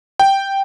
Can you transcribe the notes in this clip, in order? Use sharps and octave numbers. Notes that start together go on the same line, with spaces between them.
G5